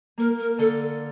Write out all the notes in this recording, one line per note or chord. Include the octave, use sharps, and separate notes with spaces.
A#3 A#4
A#4
D3 A4